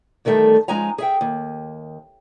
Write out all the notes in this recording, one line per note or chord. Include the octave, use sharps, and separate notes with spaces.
E2 D#3 G3 A3
F3 G#3 C#4 D#4 G#5 A#5
G#4 E5 G5
D#2